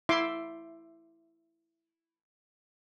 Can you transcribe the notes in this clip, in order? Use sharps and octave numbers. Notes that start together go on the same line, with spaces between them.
E4 E5 C6 D6